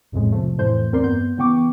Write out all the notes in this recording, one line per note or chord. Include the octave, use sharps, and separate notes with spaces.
B1 F2 A2 G#3
C3 F3 A3
F2 A2 E3 A3 C5 G6
E2 C4 A#4 D5 C6
G2 B3 G6
C#3 E3 B3 G5 C#6 D6